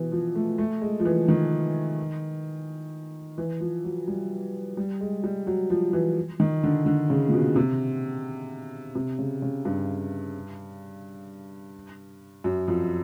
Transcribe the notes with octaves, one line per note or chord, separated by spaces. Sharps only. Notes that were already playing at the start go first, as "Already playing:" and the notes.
Already playing: B2 E3
F3
A3
A3
G#3
F3
E3
D#3
E3
F3
F#3
G3
G3
G#3
G3
F#3
F3
E3
D#3
D3
D3
C#3
A#2
B2
C3
C3
C#3
C#3
G2
F#2
F2